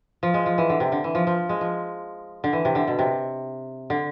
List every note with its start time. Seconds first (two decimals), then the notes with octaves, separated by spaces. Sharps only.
0.23 F3
0.34 G#3
0.46 F3
0.58 E3
0.70 D3
0.80 C3
0.92 D3
1.04 E3
1.15 F3
1.27 F3
1.49 G#3
1.61 F3
2.44 D3
2.53 E3
2.65 C3
2.75 D3
2.87 B2
2.99 C3
3.90 D3